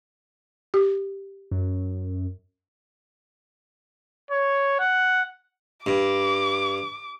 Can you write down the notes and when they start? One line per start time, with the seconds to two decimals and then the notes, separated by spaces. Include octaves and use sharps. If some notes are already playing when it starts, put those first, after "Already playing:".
0.74 G4
1.51 F#2
4.31 C#5
4.79 F#5
5.86 G2 D6